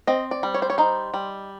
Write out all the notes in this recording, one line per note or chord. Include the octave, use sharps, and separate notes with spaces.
C4 D#5
D5
G3
C#5
C5
C#5
D#4 C5
G3